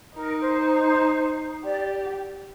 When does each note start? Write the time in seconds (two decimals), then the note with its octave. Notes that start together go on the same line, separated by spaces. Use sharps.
0.16 D#4 A#4
0.41 C5
1.64 G4 D5